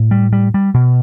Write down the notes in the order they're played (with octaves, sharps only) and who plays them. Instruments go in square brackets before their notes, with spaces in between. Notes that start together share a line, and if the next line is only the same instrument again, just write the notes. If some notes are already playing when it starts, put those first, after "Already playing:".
Already playing: [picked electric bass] A2
G3
G3
G3
B2